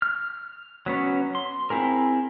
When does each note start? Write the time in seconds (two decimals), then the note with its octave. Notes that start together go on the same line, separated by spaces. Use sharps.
0.02 F6
0.86 F#3 B3 C#4
1.35 C6
1.70 C4 E4 G#4 A#4